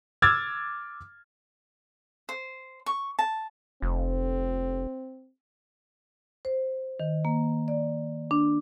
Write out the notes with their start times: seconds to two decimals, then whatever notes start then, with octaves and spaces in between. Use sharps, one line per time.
0.22 D6 E6 F6 G#6 A6
2.29 C5
2.86 C#6
3.19 A5
3.82 F1 C4
6.45 C5
7.00 D#3
7.25 A#3
7.68 D5
8.31 D4